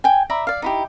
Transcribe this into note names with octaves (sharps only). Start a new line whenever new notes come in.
G5 G#5
D5 E5 A#5 B5
D5 F5
D#4 E4 G4